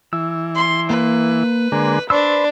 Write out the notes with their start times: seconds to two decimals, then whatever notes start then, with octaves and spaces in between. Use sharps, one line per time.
0.13 E3 E6
0.56 C6
0.90 A#3 B4
1.72 D3 G#3 A#3
2.10 D4 B4 C5 D5 C#6 E6